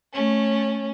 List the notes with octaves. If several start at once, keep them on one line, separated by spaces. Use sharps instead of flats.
A3 C#4